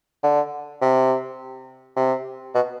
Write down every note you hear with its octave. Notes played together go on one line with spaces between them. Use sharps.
D3
C3
C3
B2